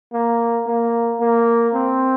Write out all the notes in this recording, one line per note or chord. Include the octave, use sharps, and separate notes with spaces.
A#3
A#3
A#3
C4